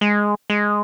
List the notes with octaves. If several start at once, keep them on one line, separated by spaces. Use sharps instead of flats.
G#3
G#3